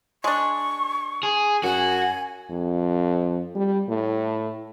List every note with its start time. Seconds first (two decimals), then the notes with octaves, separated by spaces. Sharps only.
0.24 G#3 D4 C#6
1.23 G#4
1.63 F#2 F#4 G#5
2.50 F2
3.55 G3
3.88 A2